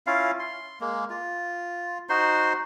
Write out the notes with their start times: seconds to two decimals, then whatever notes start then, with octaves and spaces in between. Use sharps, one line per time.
0.07 C#4 E4 F4 F5
0.39 C6
0.80 G#3 A#3
1.10 F4
2.09 D#4 F#4 C5 C6